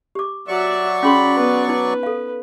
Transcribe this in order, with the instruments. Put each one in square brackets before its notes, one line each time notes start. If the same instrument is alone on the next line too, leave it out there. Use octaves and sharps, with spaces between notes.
[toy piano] G4 D6
[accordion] F#3 D5 C#6 [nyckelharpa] F#4 E5
[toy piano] C#4 G#4 C6 [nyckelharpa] B5
[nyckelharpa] B3 B4
[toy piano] D#4 [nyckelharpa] B4
[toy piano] A4 F5